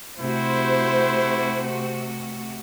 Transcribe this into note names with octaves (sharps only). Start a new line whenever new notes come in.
C3 A3 E4 F#4 C5